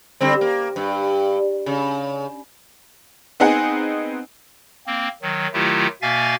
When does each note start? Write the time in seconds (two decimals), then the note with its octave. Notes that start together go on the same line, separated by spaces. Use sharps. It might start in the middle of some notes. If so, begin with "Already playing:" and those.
0.21 D3 G3 C4
0.41 A#3
0.76 G2
1.66 C#3
3.40 B3 C4 D#4 G#4 F#5
4.86 A#3 C4
5.22 D#3 F#3
5.53 D#3 F#3 A3 E4 F4 G4
6.02 B2 A#3 E5 F5 G#5 A6